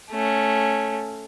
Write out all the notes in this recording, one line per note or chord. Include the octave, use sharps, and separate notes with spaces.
A3 C#4